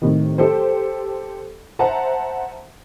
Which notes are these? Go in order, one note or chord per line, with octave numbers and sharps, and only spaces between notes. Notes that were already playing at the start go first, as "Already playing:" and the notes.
A2 C3 D#3
G4 A4 C5
C5 E5 F#5 A5 A#5